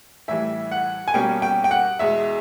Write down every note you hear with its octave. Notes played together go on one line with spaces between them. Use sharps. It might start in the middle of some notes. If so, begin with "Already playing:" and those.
A2 E3 G3 E5
F#5
G#5
B2 G3 A#3 C#4 G5
G5
G5
F#5
E2 B2 G#3 E5